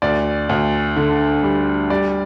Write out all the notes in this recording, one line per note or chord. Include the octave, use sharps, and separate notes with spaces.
D2 D5
D2
D3
G3
G3 D5